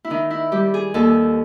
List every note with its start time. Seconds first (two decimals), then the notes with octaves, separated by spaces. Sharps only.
0.04 E4
0.10 D#3 D#4
0.31 E4
0.52 G3 G4
0.74 G#4
0.94 D#2 A4